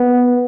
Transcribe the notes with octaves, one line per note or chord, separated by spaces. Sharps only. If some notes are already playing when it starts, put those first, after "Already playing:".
Already playing: B3